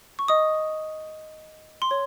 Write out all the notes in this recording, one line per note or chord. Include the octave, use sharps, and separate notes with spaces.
C#6
D#5 D#6
C6
C#5